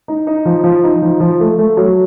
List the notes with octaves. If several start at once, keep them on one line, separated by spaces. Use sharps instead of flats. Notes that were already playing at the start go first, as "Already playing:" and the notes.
D#4
D#4
F3
F3
D#4
F3
F3
A3
A3
F#3